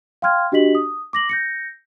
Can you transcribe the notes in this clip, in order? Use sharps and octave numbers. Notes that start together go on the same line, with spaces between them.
F5 G5 C6 F6 G#6
D4 F#4 G4 D#5 B6 F#7
D#6
D6 A#6 F#7
G6 A#6 C#7